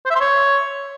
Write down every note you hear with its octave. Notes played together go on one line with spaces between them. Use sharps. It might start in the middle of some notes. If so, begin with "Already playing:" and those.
C5
E5
C6
C#5